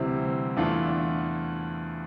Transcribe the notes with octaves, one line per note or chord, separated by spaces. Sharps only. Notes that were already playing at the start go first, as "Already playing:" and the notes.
Already playing: D2 C3 E3 G3 C4
E2 E3 A3 D4 F4